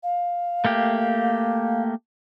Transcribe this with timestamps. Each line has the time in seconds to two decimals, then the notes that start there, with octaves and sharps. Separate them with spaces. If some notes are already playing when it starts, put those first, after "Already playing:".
0.03 F5
0.65 A3 A#3 G4